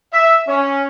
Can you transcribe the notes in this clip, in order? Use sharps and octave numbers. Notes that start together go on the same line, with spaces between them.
E5
C#4